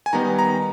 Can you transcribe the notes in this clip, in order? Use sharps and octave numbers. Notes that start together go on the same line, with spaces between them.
G#5
D#3 G3 B3 D#4 A#5
A#5